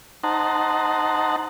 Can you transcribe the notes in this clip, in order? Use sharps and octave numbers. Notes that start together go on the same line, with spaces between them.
D#4 C5 F#5 A5 A#5